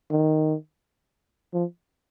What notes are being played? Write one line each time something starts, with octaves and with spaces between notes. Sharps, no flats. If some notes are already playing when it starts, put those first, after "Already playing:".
D#3
F3